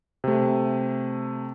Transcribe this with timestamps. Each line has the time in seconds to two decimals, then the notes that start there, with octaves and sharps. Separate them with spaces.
0.24 C3 A3